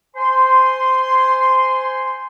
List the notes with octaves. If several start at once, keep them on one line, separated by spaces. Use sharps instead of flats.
C5 G#5 C6